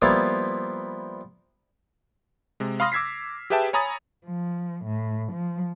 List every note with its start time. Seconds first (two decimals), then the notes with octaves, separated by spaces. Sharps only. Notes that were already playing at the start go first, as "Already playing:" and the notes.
0.02 F3 G3 A#3 B3 E4 F4
2.60 C3 G#3
2.80 F5 B5 C6 D#6 F6 A#6
2.92 D6 E6 G#6 B6 C7
3.50 G4 G#4 B4 E5 G5 A5
3.73 C#5 G#5 A#5 B5 D#6 A6
4.25 F3
4.86 A2
5.33 F3